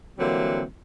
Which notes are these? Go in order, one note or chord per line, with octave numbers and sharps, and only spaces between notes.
D3 E3 F#3 G3 A#3 C4